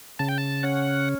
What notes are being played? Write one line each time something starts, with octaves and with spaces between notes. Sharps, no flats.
C#3 A5
G5
A5
C#4 F#5